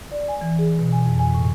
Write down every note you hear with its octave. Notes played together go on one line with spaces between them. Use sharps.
D5
G#5
E3
G#4
B2
G#5
F2
G#5
A2